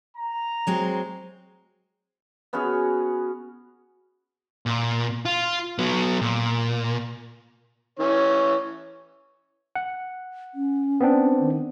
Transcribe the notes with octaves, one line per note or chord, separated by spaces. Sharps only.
A#5
F#3 G#3 C4
B3 C#4 F#4 G#4
A#2
F4
F#3 B3
A#2
E3 C#4 C#5
F#5
C#4
B3 C4 D4
D#3